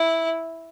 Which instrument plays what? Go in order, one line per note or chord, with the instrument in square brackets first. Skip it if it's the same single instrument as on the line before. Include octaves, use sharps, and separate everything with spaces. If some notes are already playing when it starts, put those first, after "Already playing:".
Already playing: [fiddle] E4